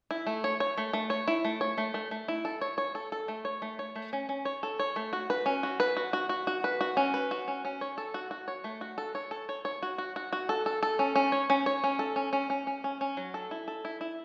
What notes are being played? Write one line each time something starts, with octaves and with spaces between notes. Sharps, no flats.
E4
A3
C#5
C#5
A3
A3
C#5
E4
A3
C#5
A3
A3
A3
E4
A4
C#5
C#5
A4
A4
A3
C#5
A3
C#5
A3
C#4
C#4
C#5
A4
C#5
A3
F#4
B4
C#4
F#4
B4
F#4
F#4
F#4
F#4
B4
F#4
C#4
B4
F#4
C#4
C#4
C#5
A4
F#4
F#4
C#5
A3
F#4
A4
C#5
A4
C#5
C#5
F#4
F#4
F#4
F#4
A4
A4
A4
C#4
C#4
C#5
C#4
C#5
C#4
A4
C#4
C#4
C#4
C#4
C#4
C#4
F#3
A4
E4
A4
E4
E4